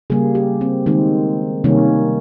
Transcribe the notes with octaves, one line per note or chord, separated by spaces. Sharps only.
C#3 G3 A#3 G#4
G4
C4
D#3 G#3 C4
C3 D#3 G3 A#3 C#4